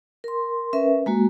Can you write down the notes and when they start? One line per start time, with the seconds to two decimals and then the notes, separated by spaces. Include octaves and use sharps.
0.24 A#4 C6
0.73 C#4 A#4 B4 E5
1.06 G#3 A#3 F#4